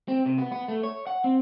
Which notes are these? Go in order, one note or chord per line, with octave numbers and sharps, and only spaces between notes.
C4
C3
B3
B3
A3
C#5
F#5
C4